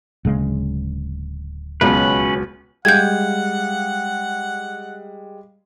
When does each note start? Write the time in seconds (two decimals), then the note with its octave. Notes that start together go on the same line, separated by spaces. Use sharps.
0.25 D1 C#3 G#3
1.81 C#2 B2 F#3 C#4 B4
2.85 G3 G#3 F5 F#5 G6 G#6